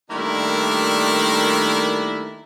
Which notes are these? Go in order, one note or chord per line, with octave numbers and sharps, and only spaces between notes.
D#3 G3 A3 A#3 D4 E4